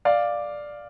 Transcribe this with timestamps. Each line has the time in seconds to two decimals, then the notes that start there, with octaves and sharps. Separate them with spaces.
0.05 D5 F5